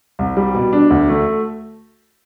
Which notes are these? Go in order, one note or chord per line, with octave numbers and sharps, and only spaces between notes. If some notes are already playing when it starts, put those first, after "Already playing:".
C2
G3
B2
D4
D2
A3